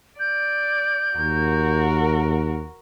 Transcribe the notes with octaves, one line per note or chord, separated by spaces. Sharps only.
D5 G6
D#2 F#4 A#4